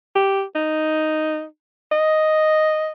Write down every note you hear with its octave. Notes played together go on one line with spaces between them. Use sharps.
G4
D#4
D#5